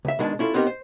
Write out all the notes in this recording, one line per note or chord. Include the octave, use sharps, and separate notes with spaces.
C#2 E5
B2 D#3 G#3 D4 D#5 A5
C#4 E4 F4 A4
B3 C4 D#4 G4 A4 A#4
C5